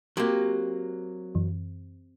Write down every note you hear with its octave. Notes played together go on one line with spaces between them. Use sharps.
F#3 A#3 C4 G4 G5
F#2 E3